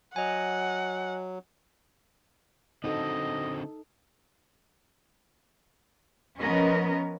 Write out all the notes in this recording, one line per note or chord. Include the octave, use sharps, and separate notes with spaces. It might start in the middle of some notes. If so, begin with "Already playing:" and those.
F#3 D#5 F#5 G#5
D3 C4 D#4 F#4 A4 D#5
F3 B3 C#4 A#4 D#5